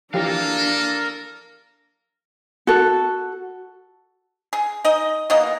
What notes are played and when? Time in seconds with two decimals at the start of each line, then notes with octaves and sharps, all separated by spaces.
0.14 E3 F3 D4 F4 G4 A4 A#4 F5
2.67 F#4 A4
4.53 G#4
4.84 D#4 D#5
5.30 B2 E3 A#3 D#5